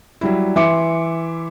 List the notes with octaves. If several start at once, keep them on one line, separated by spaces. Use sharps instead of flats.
F#3 G3 E4
E3 E5 C6 D6 C#7